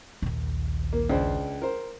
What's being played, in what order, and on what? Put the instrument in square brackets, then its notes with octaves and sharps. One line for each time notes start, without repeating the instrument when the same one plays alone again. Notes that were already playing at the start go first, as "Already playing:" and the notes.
[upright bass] A#1 D#2
[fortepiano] A#3
C#2 D4 C5
A#4 C5